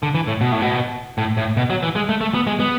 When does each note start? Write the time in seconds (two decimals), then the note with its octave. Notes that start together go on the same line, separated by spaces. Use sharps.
0.03 D3
0.15 E3
0.27 A2
0.41 B2
0.52 A2
0.62 B2
1.18 A2
1.37 A2
1.57 B2
1.70 F#3
1.83 E3
1.96 G#3
2.09 A3
2.21 A3
2.34 B3
2.47 G#3
2.60 B3